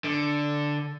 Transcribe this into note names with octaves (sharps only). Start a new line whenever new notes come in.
D3